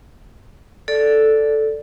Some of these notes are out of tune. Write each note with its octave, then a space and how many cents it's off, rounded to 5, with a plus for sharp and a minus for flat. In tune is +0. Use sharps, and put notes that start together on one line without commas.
A4 +0 D5 +0